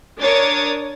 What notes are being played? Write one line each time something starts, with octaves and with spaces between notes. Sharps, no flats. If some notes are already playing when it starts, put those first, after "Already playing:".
D4 A#4 C#5 D#6 A6